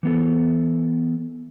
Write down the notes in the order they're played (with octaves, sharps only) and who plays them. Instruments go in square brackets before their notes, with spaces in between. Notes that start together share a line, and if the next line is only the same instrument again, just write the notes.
[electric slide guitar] E3 B3 A4